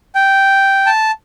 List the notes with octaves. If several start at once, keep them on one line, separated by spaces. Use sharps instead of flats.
G5
A5